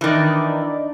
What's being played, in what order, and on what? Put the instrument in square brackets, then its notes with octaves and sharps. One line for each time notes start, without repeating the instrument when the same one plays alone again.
[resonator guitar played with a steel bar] D#3 E3 [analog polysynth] D4 D#4 D5